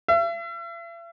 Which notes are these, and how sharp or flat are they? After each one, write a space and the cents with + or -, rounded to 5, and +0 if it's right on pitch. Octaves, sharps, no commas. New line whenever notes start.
E5 +45